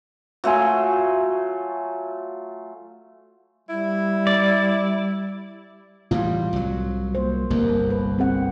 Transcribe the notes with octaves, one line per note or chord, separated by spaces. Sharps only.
F#3 A3 F4 G#5
G3 E4
D5
A2 E3 G3 F4
C2 F#3
A#3 C5
G1 C2 F2 A#3
B4
C4 G#4 F#5